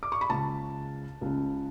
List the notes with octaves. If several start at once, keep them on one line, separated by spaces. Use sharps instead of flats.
D6
C#6
B5
C#2 C#3 A5
C#2 C#3